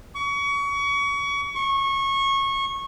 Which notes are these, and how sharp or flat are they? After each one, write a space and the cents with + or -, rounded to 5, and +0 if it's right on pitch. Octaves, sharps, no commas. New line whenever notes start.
C#6 +30
C#6 -20